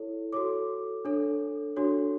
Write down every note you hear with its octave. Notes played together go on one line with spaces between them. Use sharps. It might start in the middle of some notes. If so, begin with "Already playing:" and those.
Already playing: E4 A4 C#5
F#4 A4 C#5 D6
D4 A4 C#5
D4 F#4 A4 C#5